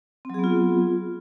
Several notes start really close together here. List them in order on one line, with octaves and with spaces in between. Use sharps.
C4 F#3 G#4 B3 F4